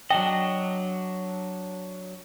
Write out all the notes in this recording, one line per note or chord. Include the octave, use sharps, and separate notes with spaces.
F#3 D4 D#5 G5